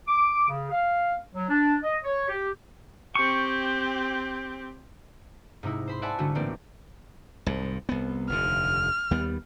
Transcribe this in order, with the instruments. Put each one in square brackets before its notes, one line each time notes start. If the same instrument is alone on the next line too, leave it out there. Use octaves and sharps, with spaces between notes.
[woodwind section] D6
C#3
F5
F#3
D4
D#5
C#5
G4
[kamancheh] C4 G4 [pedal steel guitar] C#6
[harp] G#2 C3 D#4 E4
C5 B5 C6
D5 E5 F#5 G#5 A5 B5
G#2 D3 G3 A3 F4 F#4
A1 A2 A#3 C4 D5
[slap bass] C2 G#2
C2 B3
[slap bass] F1 D#2 D3 [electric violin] F6
[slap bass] D#2 G3 B3